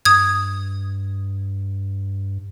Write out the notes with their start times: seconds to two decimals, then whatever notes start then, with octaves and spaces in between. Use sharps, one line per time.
0.05 G2 D#6 G#6